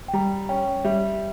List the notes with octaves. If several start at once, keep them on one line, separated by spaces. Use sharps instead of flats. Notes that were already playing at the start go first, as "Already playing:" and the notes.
G5
G3 A#5
C#4 G5
G3 E5